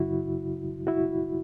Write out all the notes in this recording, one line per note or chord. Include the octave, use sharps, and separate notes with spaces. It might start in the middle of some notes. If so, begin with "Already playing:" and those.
Already playing: F#2 C#3 F#3 E4 F#4
E4 F#4